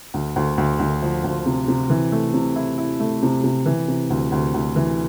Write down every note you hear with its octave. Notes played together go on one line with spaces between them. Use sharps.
D2
D2
D2
D2
F3
D2
C3
C3
E3
A3
C3
E4
E4
A3
C3
C3
E3
C3
D2
D2
D2
E3